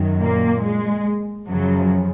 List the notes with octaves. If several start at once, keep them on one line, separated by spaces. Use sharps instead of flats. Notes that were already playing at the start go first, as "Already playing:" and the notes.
Already playing: F#2 D#3 F#3
A#2 A#3
G#3
F#2 C#3 F3 F#3